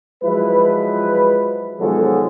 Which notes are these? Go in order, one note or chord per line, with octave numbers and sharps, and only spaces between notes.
F3 F#3 G#3 E4 B4
B2 D#3 F3 F#3 G#3 A4